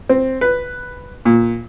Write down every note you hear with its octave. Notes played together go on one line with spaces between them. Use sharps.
C4
B4
A#2